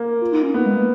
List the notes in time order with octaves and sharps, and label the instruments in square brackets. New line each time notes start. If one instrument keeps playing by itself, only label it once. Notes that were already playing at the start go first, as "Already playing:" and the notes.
Already playing: [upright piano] A#3
[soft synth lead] F4
D#4
C#4
[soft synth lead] A#3 [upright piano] B3
[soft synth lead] G#3
A#3